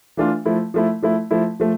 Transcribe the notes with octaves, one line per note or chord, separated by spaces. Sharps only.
E3 A3 D4 F4
F3 A3 E4
F3 A3 E4
F3 A3 E4
F3 A3 E4
F3 A3